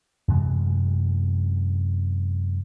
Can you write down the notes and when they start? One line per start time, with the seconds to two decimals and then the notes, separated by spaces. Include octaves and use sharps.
0.28 F#2 C3 E3 G#3